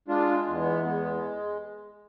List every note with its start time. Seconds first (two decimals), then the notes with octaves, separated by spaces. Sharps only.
0.08 G#3 D4 F4
0.47 E2
0.59 B3
0.85 G#3 B3